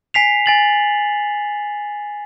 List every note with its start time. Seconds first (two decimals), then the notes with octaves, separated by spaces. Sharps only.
0.14 G#5 B6 C7 F7
0.46 G#5 A6 F#7